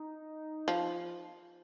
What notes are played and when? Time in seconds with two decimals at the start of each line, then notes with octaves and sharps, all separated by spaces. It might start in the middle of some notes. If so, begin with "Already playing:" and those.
Already playing: D#4
0.68 F3